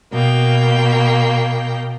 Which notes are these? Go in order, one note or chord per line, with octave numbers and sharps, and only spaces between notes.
B2 A#3 G5